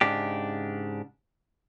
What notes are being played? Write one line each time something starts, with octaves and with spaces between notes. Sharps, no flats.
G#2 C#3 D4 G4